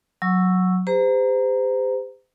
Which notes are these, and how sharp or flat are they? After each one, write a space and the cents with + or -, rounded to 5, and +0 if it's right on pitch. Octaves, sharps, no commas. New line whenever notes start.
F#3 -5 C#6 +0 E6 +0
G4 +40 C5 -35 A#5 +0